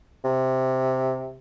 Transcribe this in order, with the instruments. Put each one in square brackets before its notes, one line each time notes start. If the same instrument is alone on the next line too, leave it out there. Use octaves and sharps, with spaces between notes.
[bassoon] C3